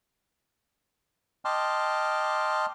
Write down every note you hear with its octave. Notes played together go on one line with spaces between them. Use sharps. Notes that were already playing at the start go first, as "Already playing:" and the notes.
D#5 G5 A5 C6 D6 F6